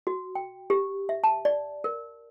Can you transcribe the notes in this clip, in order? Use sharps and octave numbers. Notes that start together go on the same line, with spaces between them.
F#4
G5
G4
E5
A5
D5
A#4